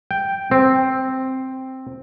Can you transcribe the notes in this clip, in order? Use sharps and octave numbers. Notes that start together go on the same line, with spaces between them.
G5
C4